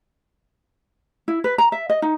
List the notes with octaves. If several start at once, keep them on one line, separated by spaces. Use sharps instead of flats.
E4
B4
A#5
E5
D#5
D#4